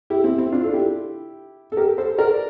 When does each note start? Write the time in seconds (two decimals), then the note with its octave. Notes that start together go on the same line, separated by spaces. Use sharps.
0.10 E4 G4
0.24 C4 E4
0.38 C4 E4
0.52 D4 F4
0.64 A4
0.73 E4 G4
1.72 A4
1.77 G4 A#4
1.98 A4 C5
2.18 A#4 D5